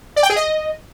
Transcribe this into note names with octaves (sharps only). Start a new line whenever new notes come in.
D5
G5
G#4
D#5